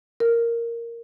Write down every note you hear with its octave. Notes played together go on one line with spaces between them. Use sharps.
A#4